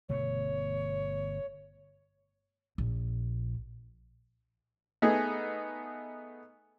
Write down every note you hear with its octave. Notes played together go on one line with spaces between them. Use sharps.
G1 B2 A3 C#5
A#1
A3 B3 D#4 G#4